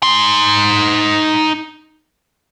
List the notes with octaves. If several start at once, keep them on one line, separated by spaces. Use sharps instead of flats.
D#4 C6